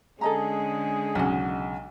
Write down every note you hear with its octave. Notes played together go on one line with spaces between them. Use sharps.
D3 G#3 C#4 G#4 A4 D#5 A#5
B1 C#3 D#5 F#5